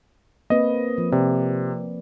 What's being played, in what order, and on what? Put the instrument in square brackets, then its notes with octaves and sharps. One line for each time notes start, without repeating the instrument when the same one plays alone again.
[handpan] A#3 C4 B4 [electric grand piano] D#5
[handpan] F3
[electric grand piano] C3 [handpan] D5